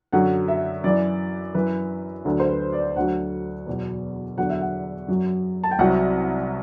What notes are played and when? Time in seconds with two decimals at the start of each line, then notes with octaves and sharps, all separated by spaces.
0.12 F#2 D3 F#3 F#5
0.48 E5
0.84 F#2 E3 D5
1.55 F#2 E3 B4
2.25 D2 D3 F#3
2.40 C5
2.49 B4
2.73 D5
2.96 D2 D3 F#3 F#5
3.66 E2 B2 F#3
4.37 E2 D3 F#3 F#5
4.49 E5
4.61 F#5
5.08 F#2 F#3
5.64 A5
5.71 G5
5.79 C2 C3 F#3 F#5